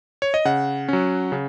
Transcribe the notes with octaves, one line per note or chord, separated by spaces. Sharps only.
C#5
D#5
C#3 F#5
F#3 C#4
C#3